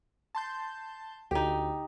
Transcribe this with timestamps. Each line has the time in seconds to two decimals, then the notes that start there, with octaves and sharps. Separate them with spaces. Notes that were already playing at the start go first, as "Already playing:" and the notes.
0.35 A5 C6 G6
1.31 D2 D#4 G4